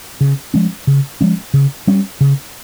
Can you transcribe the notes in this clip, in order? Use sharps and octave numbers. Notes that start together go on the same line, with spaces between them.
C#3
F3 G#3 C#4
C#3
F3 G#3 C#4
C#3
G3 C#4
C#3